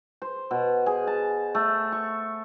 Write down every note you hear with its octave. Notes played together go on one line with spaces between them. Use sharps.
C5
B2
G#4
A5
A3
C#6